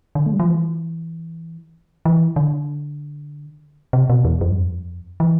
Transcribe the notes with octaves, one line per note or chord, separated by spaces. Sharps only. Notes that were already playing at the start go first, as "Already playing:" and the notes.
D3
A3
G3
F3
E3
E3
D3
C3
B2
E2
F2
G2
F2
E3